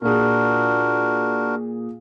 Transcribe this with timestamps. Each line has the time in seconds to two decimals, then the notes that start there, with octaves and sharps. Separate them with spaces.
0.02 A#2 D4 F#4 G#4 A#4